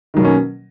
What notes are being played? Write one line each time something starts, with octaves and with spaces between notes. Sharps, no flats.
B2 D#3 F#3 A#3 C#4